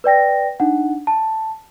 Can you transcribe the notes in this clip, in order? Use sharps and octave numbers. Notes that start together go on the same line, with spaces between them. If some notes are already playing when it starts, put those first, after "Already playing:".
B4 D5 G5 A#6
D4 D#4 F#5
A5